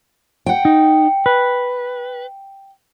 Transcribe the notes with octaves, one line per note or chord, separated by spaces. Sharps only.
F#5 G5
D#4
B4